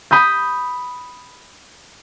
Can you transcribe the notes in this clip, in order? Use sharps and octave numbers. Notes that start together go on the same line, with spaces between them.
B5 D#6 G6